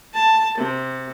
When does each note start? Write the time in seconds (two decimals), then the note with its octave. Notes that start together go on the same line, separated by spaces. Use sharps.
0.14 A5
0.58 C3